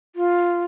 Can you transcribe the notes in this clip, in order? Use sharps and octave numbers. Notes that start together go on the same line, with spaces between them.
F4